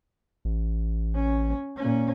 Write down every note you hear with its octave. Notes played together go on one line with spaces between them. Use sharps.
A1
C#4
A#2 C#4